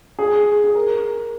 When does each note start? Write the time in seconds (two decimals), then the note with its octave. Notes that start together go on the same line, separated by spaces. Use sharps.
0.19 G#4
0.64 G#4
0.75 A#4